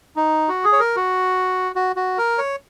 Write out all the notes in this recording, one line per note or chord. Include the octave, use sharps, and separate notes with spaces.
D#4
F#4
G#4
C#5
A#4
F#4
F#4
F#4
A#4
C#5